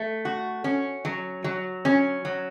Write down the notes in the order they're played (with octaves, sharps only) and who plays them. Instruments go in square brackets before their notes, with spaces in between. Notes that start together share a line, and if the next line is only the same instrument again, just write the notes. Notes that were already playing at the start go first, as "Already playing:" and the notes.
Already playing: [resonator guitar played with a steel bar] A3
F#4
C#4
F#3
F#3
C#4
F#3